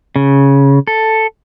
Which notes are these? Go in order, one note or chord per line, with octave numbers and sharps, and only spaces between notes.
C#3
A4